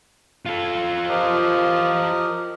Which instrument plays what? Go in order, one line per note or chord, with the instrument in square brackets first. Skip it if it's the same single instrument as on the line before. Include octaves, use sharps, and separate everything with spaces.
[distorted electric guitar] F4 A4
[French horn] F3 [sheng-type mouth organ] G4 A#4 D#5